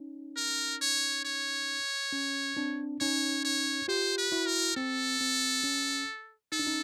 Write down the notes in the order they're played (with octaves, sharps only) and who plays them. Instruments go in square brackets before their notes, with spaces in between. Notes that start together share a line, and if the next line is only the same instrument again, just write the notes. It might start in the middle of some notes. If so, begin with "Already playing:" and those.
Already playing: [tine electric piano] C#4 D#4
[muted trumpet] A#4
C#5
C#5
[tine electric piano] C#4
C4 D4
[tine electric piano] C#4 D#4 [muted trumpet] C#5
[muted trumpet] C#5
[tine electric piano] F4 G4 [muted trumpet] C5
[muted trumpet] B4
[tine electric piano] E4 F#4
[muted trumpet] A#4
[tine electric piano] C4 [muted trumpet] A4
[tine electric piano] C4
C#4
[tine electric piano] D#4 [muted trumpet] A4
[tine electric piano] D4
C#4 D#4